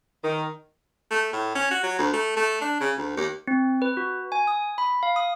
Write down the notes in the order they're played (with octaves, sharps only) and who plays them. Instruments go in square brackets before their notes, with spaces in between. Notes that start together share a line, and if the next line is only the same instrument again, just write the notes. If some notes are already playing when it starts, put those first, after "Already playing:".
[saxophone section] D#3
[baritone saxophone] A3
A2
C#4
F#4
F#3
D2
A3
A3
D4
C#3
D2
D#2
[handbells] C4
B4
F#4
G#5
D#6
B5
F5
D#6